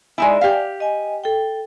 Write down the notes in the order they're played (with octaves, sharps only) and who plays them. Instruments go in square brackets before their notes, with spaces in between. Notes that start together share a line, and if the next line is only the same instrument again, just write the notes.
[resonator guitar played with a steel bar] G#3 D#4 E4 [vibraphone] D5 E5 G#5
[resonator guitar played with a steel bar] G4 F5
[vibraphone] D#5 G#5
A4 G5